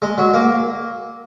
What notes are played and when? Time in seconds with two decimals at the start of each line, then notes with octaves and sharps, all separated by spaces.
0.02 G#3
0.18 F#3
0.34 A#3